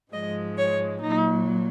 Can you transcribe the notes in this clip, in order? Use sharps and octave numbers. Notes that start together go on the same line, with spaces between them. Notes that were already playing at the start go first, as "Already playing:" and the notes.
G#2 F3 G#3 D#5
C#5
A#2 F#3 D#4